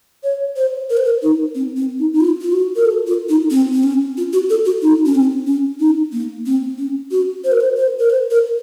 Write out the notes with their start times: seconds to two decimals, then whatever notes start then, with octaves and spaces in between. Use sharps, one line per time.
0.24 C#5
0.56 C5
0.90 A#4
0.97 C5
1.05 A#4
1.22 D#4
1.55 C4
1.77 C4
1.99 D#4
2.13 D#4
2.20 F4
2.41 F4
2.52 F#4
2.76 A#4
2.85 A4
3.07 F4
3.29 D#4
3.51 C4
3.73 C4
3.83 C#4
4.17 F4
4.33 F#4
4.50 A4
4.65 F#4
4.82 D#4
5.06 C#4
5.15 C4
5.47 C#4
5.80 D#4
6.12 A#3
6.46 C4
6.78 C#4
7.11 F#4
7.44 C5
7.52 A#4
7.60 C5
7.77 C5
8.00 A#4
8.10 C5
8.31 A#4